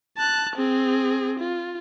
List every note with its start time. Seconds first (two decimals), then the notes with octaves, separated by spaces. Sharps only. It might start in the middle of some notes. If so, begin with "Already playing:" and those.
0.17 A5 F#6
0.56 C4 G#4
1.39 F4